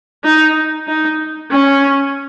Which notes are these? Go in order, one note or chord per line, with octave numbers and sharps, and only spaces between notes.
D#4
D#4
C#4